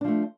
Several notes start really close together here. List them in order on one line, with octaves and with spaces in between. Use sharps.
D4 F3 A3